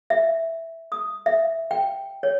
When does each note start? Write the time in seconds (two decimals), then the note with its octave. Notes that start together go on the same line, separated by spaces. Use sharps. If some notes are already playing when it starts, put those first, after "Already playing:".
0.10 E5
0.92 D#6
1.26 E5
1.71 G5
2.23 C#5